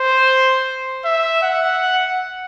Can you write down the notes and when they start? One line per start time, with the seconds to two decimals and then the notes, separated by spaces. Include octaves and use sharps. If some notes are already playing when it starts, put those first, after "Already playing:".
Already playing: C5
1.05 E5
1.43 F#5